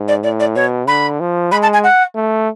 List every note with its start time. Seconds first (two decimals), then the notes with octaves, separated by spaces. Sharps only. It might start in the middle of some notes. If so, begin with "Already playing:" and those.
Already playing: G#2
0.08 D5
0.23 A2 D5
0.40 D5
0.56 B2 C#5
0.88 D3 B5
1.20 F3
1.52 G#3 B5
1.62 A5
1.73 G#5
1.84 F#5
2.15 A3